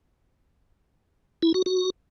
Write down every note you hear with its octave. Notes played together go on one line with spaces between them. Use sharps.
E4
F#4
F#4